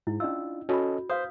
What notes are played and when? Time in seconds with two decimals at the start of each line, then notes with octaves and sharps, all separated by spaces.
0.07 G#2 E4
0.20 C#4 D4 F4 D#5 E6
0.69 C#4 F#4 A4 D#5 B5
1.10 B4 C5 F5 D#6 G6